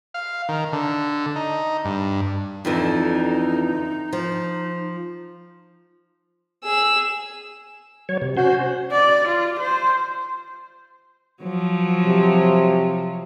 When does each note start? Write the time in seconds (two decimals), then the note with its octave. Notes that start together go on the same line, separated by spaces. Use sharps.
0.14 F5
0.49 D#3
0.72 D3
1.36 D#4
1.85 G2
2.65 F2 D3 E3 D#4
4.13 F3
6.64 G#4 E6
8.09 F#3 C#5
8.22 C3
8.37 C#4 F#4 C5
8.92 D5
9.28 F4
9.59 C5
11.43 F3 F#3
12.06 C3